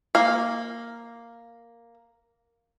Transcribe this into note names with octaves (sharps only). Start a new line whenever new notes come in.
A#3 F5